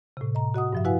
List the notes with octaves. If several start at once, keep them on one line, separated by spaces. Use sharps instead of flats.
A2 C3
D#5 A#5
F#4 D#5 F#5 D#6
G2 F3 E5
E4 F#4 B4 F5 F#5 G#5